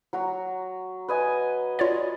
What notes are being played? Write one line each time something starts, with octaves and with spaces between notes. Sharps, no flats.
F#3 F#4 A#5
B4 D#5 G#5
F4 C#5 D5